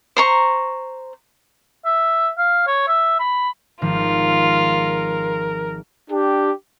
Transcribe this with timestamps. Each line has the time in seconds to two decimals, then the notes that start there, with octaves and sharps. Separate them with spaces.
0.17 C5 A#5 C#6
1.85 E5
2.38 F5
2.67 C#5
2.88 E5
3.19 B5
3.82 G#1 F3 F4 A#4
6.11 D4 G4